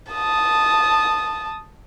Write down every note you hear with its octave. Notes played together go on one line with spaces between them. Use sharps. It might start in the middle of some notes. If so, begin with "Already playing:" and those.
A5 D#6